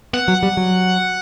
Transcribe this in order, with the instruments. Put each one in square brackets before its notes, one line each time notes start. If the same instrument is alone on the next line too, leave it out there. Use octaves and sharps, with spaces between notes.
[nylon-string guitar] B3 [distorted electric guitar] F#5
[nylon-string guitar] F#3
G3
F#3